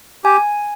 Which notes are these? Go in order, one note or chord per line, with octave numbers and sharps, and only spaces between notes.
G4 G#5